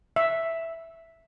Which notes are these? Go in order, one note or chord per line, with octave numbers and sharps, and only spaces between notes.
E5